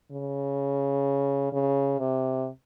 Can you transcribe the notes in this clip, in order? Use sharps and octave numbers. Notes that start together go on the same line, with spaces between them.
C#3
C#3
C3